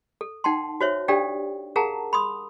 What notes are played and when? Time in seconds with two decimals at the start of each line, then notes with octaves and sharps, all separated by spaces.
0.21 A4
0.44 D#4 F#5 G5 A5 C6
0.81 F#4 C5 C#5 E5
1.08 D4 G4 A4 D5 F5 G5
1.76 G#4 A#4 F5 F#5 A5 A#5
2.13 B5 C6 D#6